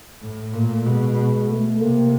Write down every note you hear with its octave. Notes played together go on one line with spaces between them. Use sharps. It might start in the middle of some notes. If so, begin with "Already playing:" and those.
A2
A#2 A3
B2 G#3
A3
C3 A#3